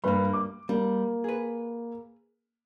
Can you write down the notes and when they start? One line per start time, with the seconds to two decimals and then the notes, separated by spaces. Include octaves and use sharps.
0.04 G2 G3 A#3 B4 B5
0.33 D6
0.69 G3 A#3
1.24 G#4 B4